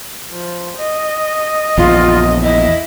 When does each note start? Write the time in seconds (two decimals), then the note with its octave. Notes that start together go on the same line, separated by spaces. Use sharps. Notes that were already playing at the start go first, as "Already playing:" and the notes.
0.31 F3
0.77 D#5
1.78 A#1 E2 F4
2.44 E4 D#5